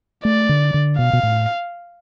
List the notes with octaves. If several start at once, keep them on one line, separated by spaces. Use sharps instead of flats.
A3 D5
D3
D3
B2 F5
B2
A2